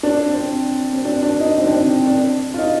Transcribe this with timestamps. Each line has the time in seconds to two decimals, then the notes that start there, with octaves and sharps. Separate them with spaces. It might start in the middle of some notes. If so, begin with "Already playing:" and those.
0.03 D4
0.29 C4
0.93 C4
1.05 D4
1.22 D4
1.40 D#4
1.57 C4
1.64 D4
1.72 C4
2.07 D4
2.54 F4
2.58 D#4